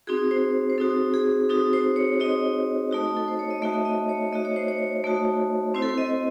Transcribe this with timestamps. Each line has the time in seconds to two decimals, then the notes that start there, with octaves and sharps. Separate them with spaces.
0.07 C4 D#4 F#4 G#4
0.31 C5
0.70 C5
0.78 C4 D#4 F#4 A4
1.14 G#4
1.49 C4 D#4 F#4 A4
1.73 C5
1.96 C#5
2.20 C4 D#4 F#4 D#5
2.91 A3 D#4 F#4
3.17 A4
3.28 C5
3.39 C#5
3.50 D#5
3.62 A3 D#4 F#4 E5
3.85 D#5
4.09 C#5
4.32 A3 D#4 F#4 D#5
4.45 C#5
4.56 C5
4.68 C#5
5.04 A3 D#4 F#4
5.74 C4 E4 C5
5.82 A4
5.89 C5
5.98 D#5